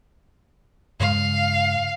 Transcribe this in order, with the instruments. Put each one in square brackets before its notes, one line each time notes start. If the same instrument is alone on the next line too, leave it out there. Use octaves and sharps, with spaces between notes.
[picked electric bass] G2 C#3 G#3 [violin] F5